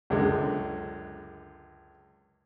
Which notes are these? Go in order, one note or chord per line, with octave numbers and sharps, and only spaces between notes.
C#2 F#2 D3 G#3